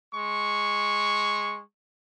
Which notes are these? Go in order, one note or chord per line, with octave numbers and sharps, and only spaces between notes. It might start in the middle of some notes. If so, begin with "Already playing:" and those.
G#3 C#6